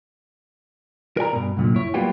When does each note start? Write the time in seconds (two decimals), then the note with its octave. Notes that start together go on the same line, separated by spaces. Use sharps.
1.17 A#4 D5 G#5 A#5
1.32 G2 B2
1.57 C2 F#2 A#2 D3
1.75 E4 C#5
1.94 F#3 G3 A#3 B3 F4 G4